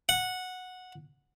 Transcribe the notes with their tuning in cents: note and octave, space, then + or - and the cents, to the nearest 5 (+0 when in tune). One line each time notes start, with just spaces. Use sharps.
F#5 -10